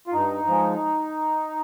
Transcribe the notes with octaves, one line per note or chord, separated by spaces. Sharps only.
F4
G2 D#4
F3 G#3